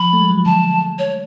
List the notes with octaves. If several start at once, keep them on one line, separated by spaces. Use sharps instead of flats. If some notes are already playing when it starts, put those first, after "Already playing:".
Already playing: F3 B5
A3
G#3
F#3
F3
D3 A5
C#5